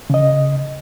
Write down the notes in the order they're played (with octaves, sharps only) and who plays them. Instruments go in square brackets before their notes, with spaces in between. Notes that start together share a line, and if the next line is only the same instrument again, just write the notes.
[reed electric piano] C#3 D#5